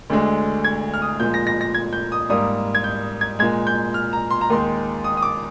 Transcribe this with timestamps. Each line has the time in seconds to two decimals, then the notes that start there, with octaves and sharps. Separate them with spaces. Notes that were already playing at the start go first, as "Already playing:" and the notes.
0.10 D2 D3 G#3
0.64 G#6
0.94 F6
1.02 D#6
1.20 A#2 F3 G#3 G6
1.34 A#6
1.47 A#6
1.61 A#6
1.74 G#6
1.93 G6
2.12 D#6
2.29 G#2 G3 A#3 D#6
2.75 G#6
2.84 G6
3.21 G#6
3.39 A#2 G#3 G#6
3.67 G6
3.94 F6
4.13 A#5
4.31 C6
4.41 A#5
4.50 D#2 D#3 G#3 C6
5.04 D#6
5.17 D#6
5.22 D6